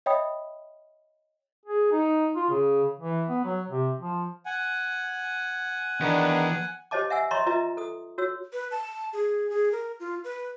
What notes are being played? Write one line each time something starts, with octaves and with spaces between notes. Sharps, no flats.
C#5 D#5 E5 G5 B5 D#6
G#4
D#4
F4
C#3
E3
B3
F#3
C3
F3
F#5 G#5
E2 D#3 B3 D4 A#5
G4 C5 C#5 D#5 A5 D6
E5 F#5 G#5 E6
C#5 D#5 E5 A#5 C6 C#6
F4 B4 D#5 E5 A#5
A4 D#6
F#4 C#5 E6
B4
A5
G#4
G#4
A#4
F4
B4